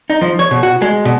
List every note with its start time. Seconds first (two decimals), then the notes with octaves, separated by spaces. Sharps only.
0.10 D#4
0.21 F3
0.39 C#5
0.51 B2
0.63 F#4
0.82 G#3
1.05 B2